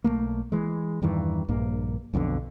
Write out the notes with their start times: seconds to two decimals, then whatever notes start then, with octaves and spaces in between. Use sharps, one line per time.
0.04 B1 A2 A3 A#3
0.52 E3 G#3
1.02 E2 G2 D#3 E3
1.49 A#1 G2 A#3
2.13 B1 F2 B2 D3